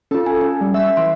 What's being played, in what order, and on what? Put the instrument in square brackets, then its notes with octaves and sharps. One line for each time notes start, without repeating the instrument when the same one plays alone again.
[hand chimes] C#4 F4 [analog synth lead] A4
[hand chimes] G#5
C#4
[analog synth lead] G3
[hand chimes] E5 [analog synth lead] E6
[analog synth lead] E3 [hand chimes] C6